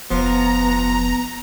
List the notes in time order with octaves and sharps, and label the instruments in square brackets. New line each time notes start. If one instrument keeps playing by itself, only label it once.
[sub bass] F1 [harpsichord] F3 [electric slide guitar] B3 [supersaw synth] A#5